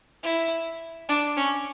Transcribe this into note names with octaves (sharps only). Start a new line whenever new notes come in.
E4
D4
C#4